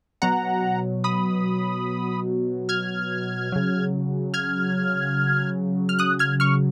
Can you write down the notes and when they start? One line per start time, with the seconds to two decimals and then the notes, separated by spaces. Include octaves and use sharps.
0.22 B2 F#3 F#5 A#5
1.04 B5 D#6
2.69 F6 G#6
3.52 C#3 F#3
4.34 F6 G#6
5.89 F6
5.99 D#6 F#6
6.19 F6 G#6
6.40 C#6 F6